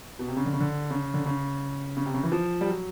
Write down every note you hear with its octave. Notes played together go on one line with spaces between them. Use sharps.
B2
C3
C#3
D3
C#3
D3
C#3
D3
C#3
C#3
C3
C#3
E3
F3
G3
F#3